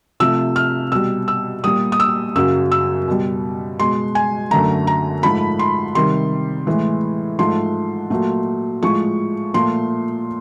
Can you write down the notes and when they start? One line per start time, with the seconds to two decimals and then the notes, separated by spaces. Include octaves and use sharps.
0.20 C3 F3 A3 E6
0.56 F6
0.92 B2 G3 E6
1.28 E6
1.64 A#2 G3 D#6
1.92 D#6
2.00 E6
2.35 F#2 C#3 F#3 E6
2.72 E6
3.08 B2 G3
3.79 B2 G#3 C6
4.15 G#5
4.51 F#2 D3 F#3 A3 A#5
4.87 A#5
5.23 G#2 F3 A3 B5
5.59 C6
5.95 C3 D#3 G3 C6
6.67 A2 E3 G#3
7.39 G#2 F3 A3 C6
8.10 A#2 F#3 A3
8.83 A2 F3 G#3 C#6
9.54 A#2 F3 A3 C6